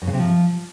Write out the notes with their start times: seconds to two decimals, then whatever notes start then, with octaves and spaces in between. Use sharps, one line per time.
0.02 F#2
0.07 C#3
0.13 C3
0.19 F3